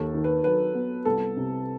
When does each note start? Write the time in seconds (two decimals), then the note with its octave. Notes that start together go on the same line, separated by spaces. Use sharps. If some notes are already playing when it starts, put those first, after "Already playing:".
Already playing: D#2 A4
0.14 D#3
0.24 B4
0.44 F#3 B4
0.75 B3
1.05 C2 A4
1.36 C3